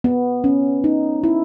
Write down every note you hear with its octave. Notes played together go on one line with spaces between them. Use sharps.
B3
C#4
D#4
E4